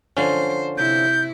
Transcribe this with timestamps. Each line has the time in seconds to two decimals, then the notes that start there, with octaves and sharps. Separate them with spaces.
0.17 D3 F3 C#4 C5
0.78 C3 E4 G6